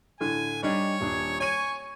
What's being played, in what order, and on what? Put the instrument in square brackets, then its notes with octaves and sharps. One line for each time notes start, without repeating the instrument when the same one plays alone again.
[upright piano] A2 D3 [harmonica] G#5
[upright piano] G3 D4 D#4 [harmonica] C#5
[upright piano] D#1 D4
[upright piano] C#5 D#7 [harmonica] G#5 C#6